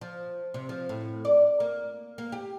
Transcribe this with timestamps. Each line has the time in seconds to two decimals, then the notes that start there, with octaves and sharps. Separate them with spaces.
0.01 F3
0.54 C3
0.69 F3
0.89 A2
1.25 D5
1.60 A#3
2.18 A#3
2.32 G4